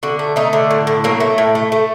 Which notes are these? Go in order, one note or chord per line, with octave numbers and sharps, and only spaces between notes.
D3 F#4
A3
A3 D#4
D3
A2
A2
F#3 A#3
A3
A2
A3
A3